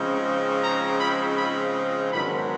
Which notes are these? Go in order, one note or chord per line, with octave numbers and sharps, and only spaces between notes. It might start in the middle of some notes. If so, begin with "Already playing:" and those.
Already playing: C#3 F3 G#3 C4 D#4
A#5
B5
B5
G#2 D#3 F#3 B3 D4 B5